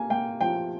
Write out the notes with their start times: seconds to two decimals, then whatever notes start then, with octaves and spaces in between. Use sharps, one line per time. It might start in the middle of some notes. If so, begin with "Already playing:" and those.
Already playing: A#3 G#5
0.10 A#3 G5
0.41 F3 G5